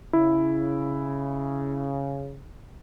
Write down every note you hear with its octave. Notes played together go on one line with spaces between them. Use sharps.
C#3 E4